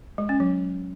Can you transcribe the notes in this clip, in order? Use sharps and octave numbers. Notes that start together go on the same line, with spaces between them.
G#3
C#4
F#3